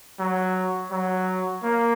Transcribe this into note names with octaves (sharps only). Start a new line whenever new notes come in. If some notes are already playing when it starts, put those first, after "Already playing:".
F#3
F#3
A#3